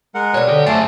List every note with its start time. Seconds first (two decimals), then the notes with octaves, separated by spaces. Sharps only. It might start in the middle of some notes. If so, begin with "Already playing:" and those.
0.15 G#3 A#4 F#5
0.34 B2 G3 C#5
0.49 D3 G4 D#5
0.67 F#2 A3 G#4 C5 F5 A5 D6